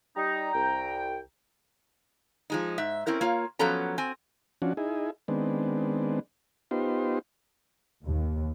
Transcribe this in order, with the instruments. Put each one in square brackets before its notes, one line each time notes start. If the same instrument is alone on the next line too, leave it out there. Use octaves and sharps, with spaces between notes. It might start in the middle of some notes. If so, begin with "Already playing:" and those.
[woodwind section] G3 D#4 [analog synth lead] A#5
[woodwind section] C2 G5
[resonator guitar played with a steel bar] F3 G#3 D#4
G#2 E5
C4 C#4 E4 A#4
A#3 F4 C#5
F3 F#3 B3 C#4 A4 A#5
C4 G#5
[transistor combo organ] F3 C#4 D4 F#4
D#4 E4 G#4
D#3 G#3 B3 C4 D4
B3 D#4 F4 G4 C5
[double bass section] D#2